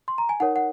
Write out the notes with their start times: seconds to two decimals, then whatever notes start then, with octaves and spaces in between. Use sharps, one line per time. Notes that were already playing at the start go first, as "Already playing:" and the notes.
0.08 C6
0.18 A#5
0.29 G#5
0.40 D#4 A#4 C#5 F#5
0.56 F#5